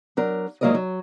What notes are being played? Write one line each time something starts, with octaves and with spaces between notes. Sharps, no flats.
F#3 D4 A#4
G#2 F#3 A#3 A#4 D5 D#5
F#3